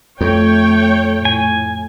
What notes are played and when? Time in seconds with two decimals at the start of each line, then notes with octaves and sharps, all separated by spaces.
0.21 F2 A3 C#5 G5
1.25 A2 G#5